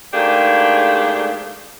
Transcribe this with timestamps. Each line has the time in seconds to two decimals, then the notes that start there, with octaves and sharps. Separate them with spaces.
0.13 G#2 A3 A#3 D4 G4 G#4